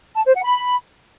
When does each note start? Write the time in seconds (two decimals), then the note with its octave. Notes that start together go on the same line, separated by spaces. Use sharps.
0.16 A5
0.25 C5
0.34 F#5
0.44 B5